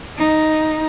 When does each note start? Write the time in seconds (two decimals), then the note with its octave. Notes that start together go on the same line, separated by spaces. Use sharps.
0.18 D#4